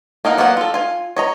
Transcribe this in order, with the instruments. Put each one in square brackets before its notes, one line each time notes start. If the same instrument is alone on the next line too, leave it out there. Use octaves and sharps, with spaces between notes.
[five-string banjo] A#3 D#4 A#4 F#5
F#3 A#3 B3 F4 F#5
F4 A4
F4 G#5
C#5 D#5 A#5